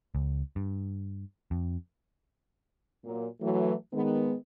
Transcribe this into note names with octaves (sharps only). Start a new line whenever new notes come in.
C#2
G2
F2
A#2 F#3
E3 F#3 A3
D#3 G#3 B3